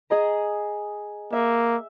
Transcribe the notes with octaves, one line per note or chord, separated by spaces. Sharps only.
G#4 D#5 A#5
A#3 E5